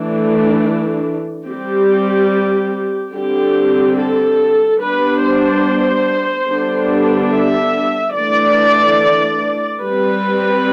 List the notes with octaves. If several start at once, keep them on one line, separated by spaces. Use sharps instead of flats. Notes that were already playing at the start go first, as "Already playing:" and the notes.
Already playing: E3 A3 D4
G3 C4 G4
D3 G3 C4 G4
A4
G3 B3 D4 B4
C5
D3 G3 B3 D4
E5
E3 A3 D4 D5
G3 C4 B4